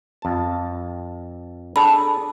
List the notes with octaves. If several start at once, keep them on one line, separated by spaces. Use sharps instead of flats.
F2 A5
D4 G#4 A4 A5 B5